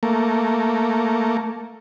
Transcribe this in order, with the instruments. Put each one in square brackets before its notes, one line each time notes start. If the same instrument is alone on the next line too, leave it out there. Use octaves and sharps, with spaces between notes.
[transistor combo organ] A3 A#3